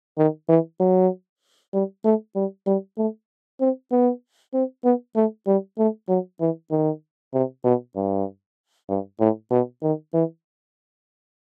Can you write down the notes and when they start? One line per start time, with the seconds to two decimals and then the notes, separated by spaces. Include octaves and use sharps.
0.18 D#3
0.49 E3
0.80 F#3
1.73 G3
2.04 A3
2.35 G3
2.67 G3
2.98 A3
3.60 C4
3.91 B3
4.53 C4
4.84 B3
5.16 A3
5.47 G3
5.78 A3
6.09 F#3
6.40 E3
6.71 D#3
7.33 C3
7.64 B2
7.96 G2
8.89 G2
9.20 A2
9.51 B2
9.82 D#3
10.14 E3